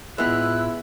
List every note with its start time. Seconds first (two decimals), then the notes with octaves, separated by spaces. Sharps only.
0.18 A2 G#3 B3 E4 F4 E6 F#6